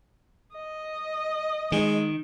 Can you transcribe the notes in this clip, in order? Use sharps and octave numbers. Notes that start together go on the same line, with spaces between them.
D#5
D#3 G#3